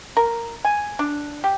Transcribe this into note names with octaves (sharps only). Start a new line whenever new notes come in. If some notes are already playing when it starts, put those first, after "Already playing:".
A#4
G#5
D4
G4